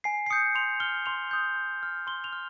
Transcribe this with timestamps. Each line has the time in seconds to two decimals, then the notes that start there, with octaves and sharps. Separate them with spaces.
0.04 G#5 C7
0.26 C7
0.30 D#6 G6 C#7
0.55 C6 F7
0.80 F6 G7
1.06 C6 F7
1.31 D#6 G6
1.56 C6
1.83 F6
2.07 C6 G7
2.24 F7
2.33 F6